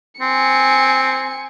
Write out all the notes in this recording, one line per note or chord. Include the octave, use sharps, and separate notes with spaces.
C4 G#5 C#7